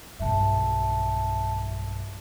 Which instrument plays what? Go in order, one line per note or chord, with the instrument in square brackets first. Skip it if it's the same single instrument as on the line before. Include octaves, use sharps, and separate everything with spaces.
[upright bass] B1 G2 [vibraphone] E5 A5